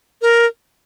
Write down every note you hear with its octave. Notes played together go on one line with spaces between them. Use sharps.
A#4